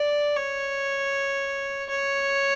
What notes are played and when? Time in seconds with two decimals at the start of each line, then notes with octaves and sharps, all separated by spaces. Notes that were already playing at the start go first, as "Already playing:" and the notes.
Already playing: D5
0.37 C#5
1.90 C#5